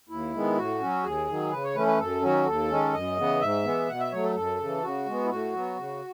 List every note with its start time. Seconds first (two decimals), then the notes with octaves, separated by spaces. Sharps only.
0.09 D#2 E4
0.34 D#3 G#3 B3
0.57 A2 F#4
0.80 F#3 C#4
1.04 D#2 G#4
1.28 D#3 F#3
1.51 C#3 B4
1.64 C#5
1.75 E3 A3 C#4 B4
1.87 B4
1.99 F#2 A4
2.22 D#3 F#3 C#4 F#4
2.46 D#2 A4
2.70 D#3 G#3 C#4
2.93 F#2 D#5
3.17 C#3 E3 B3
3.41 G#2 E5
3.64 E3 G#3 B3
3.88 B2 F#5
4.00 E5
4.12 F#3 A3 C#5
4.23 A4
4.35 F#2 A4
4.59 C#3 E3
4.83 C#3 F#4
5.06 G#3 B3
5.25 E4
5.30 A2 F#4
5.53 F#3 B3
5.77 C#3